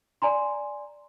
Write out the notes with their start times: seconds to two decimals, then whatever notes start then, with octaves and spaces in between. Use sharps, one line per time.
0.22 D5 G#5 A#5 C6